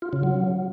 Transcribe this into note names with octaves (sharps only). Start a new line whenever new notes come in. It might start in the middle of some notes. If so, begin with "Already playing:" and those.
F4
C#3
F#3